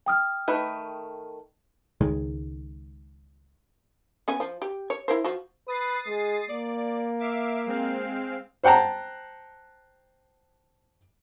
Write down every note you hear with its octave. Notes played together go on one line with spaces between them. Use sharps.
G5 D#6 F6
D#3 A3 B4
C#2 D#3 G#3
B3 C#4 G#5
F3
G4
C#5
E4 A#4 C5
F3 F#4
B4 D#6 A6 C7
G#3
A#3 D5
E5 F5 D6
G#3 C4 F5
C5 F#5 G5 A5 A#5